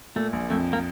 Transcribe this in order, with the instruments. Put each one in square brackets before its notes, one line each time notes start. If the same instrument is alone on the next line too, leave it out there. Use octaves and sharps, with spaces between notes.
[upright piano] A#2 [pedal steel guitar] A3
[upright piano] A#1
[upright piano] F2 [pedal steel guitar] A3
[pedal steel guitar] A#3